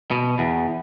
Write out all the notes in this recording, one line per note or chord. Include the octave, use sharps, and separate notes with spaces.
B2
E2